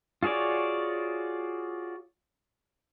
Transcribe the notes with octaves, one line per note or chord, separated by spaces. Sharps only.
F4 F#4 G#4 C#5 D5